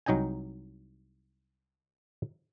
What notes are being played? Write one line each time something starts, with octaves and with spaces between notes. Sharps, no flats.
C2 F#3 D#4 D#5 G5 G#5